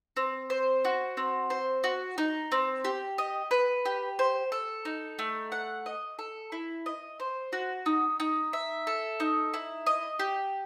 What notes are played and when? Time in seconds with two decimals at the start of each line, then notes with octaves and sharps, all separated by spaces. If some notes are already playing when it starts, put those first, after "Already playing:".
0.16 C4
0.50 C5
0.85 F#4
1.17 C4
1.50 C5
1.84 F#4
2.18 D#4
2.52 C4
2.85 G4
3.18 D#5
3.51 B4
3.85 G4
4.19 C5
4.52 A4
4.85 D#4
5.19 A3
5.52 F#5
5.86 D#5
6.19 A4
6.52 E4
6.86 D#5
7.20 C5
7.53 F#4
7.86 D#4
8.20 D#4
8.53 E5
8.87 A4
9.20 D#4
9.54 E4
9.86 D#5
10.19 G4